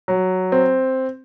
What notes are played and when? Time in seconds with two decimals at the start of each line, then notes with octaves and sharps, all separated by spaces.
0.08 F#3
0.52 C4